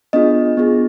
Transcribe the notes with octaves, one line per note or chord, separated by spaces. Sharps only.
B3 D4 F4 G#4 D#5
B3 D4 F4 G#4